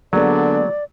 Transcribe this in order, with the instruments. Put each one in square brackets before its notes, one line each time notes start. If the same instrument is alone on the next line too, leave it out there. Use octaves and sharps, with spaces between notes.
[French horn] D3 [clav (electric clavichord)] F#3 [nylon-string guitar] G#3 A#3 B3 [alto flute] D5